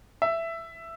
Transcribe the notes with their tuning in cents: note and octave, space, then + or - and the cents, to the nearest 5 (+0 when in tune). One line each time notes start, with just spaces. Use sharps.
E5 +10